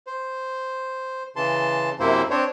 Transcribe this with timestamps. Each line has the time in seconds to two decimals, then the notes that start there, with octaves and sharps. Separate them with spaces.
0.07 C5
1.36 C#3 E3 A5 C6
2.00 F#2 C3 A#3 E4 C5
2.31 C4 D4 C5 C#5